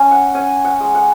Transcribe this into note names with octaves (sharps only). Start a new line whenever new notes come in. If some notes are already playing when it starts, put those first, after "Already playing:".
Already playing: C#4 G#5
F#5
C#4 G#5
F#5
G#3
F#5